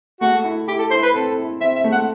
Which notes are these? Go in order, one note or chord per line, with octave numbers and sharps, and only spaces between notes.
A3 F#4
E4
E4 G4
A4
E4 C5
B4
C4 A4
E4
C4 E5
E5
A3
F#5